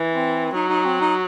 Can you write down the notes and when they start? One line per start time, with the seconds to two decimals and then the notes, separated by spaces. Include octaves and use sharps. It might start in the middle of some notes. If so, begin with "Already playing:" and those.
Already playing: E3
0.13 C4
0.54 F#3 D#4
0.69 D#4
0.85 C4
1.01 D#4